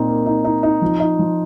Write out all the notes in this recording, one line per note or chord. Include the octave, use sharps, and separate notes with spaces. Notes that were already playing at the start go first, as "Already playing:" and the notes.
Already playing: A#2 C4 D#4
A#3
D#4
D#4
D#4
F3
D#4
F3